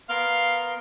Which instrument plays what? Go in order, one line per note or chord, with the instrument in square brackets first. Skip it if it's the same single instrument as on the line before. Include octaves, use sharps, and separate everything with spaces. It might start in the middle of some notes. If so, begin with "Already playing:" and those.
[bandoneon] B3 A#4 C6 [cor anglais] F5